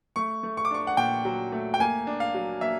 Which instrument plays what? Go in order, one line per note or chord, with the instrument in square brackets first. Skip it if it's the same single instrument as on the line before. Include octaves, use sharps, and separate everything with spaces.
[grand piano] A3 C#6
A3
C#6
D6
D4 C#6
F#5
A#2 G5
F#3
A3
G5
A#3 G#5
D4
F5
F#3
A#3 E5